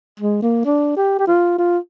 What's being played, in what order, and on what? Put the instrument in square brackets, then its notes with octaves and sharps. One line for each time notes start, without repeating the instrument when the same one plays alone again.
[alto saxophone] G#3
A#3
D4
G4
G4
F4
F4